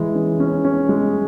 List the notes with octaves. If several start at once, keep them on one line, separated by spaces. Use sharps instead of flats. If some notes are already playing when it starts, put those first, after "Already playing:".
Already playing: E3 G#3
C#4
C#4
C#4
G#3